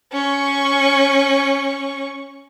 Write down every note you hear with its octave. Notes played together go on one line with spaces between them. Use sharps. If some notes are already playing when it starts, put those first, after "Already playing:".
C#4 C#6